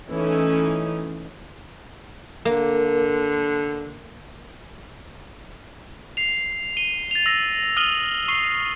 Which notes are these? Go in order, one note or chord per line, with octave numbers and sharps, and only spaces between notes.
E3 A3 C#4 D#4
D3 A#3
C7 F7
D#7 G7
A6 F7
E6 A#6
D#6 F6 A6 D#7 F#7 G7
C#6 C7 D#7 G7